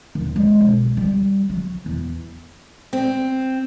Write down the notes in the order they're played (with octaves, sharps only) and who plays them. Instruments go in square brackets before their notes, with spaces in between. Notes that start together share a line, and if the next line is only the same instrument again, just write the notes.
[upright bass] D#2
G#3
B1
G3
F#3
E2
[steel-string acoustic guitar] C4